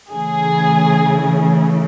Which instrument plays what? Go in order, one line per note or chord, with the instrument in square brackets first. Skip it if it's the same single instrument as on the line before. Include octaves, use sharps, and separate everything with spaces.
[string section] C#3 E3 A3 G#4